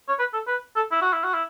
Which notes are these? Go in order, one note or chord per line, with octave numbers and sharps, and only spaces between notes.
C#5
B4
A4
B4
A4
E4
F#4
E4
F#4
E4